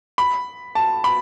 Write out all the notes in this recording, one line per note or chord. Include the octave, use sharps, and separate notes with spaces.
B5
A5
B5